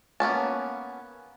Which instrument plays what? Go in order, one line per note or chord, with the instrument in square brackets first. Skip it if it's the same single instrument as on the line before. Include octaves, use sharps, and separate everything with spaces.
[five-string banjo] A#3 B3 C#4 A5